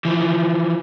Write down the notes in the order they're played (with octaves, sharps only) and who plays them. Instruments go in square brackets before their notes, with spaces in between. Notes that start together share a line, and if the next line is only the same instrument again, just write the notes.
[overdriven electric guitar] E3 F3